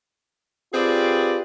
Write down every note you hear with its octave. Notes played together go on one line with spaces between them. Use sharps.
C4 F4 G4 G#4 B4 D5